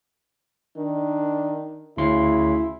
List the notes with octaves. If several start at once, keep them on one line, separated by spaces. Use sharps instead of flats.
D#3 D4
D2 C#3 E4 C6